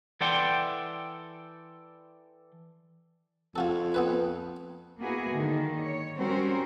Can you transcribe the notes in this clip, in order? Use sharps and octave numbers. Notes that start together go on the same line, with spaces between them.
E3 A4 D5 F#5 G5 C6
F2 F4 F#4 A4
B3 C4 B4
A#3 B3 E4 F#4 G#4
D3 D#3 A#3
C#5
G3 C4 C#4 F#4 A#4 C5